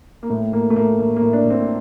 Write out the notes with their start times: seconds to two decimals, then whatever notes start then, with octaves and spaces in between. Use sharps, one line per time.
0.23 A#3
0.30 A2 A3
0.53 A2 A#3
0.70 A3
0.76 A2 A#3
0.99 A2 A#3
1.16 A#3
1.22 A2
1.33 D4
1.45 A2
1.50 C4